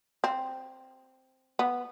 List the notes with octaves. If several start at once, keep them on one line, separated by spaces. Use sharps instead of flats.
C4
B3